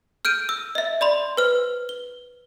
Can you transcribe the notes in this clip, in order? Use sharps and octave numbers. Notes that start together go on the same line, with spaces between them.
F6 G6 D7 D#7
E6
D#5 E5
D5 B5 C6
B4 C5 F6
G7